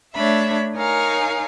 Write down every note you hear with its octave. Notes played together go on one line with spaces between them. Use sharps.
A3 D4 C#5 E5 B5
D#4 A#4 C#5 F5 G#5 A#5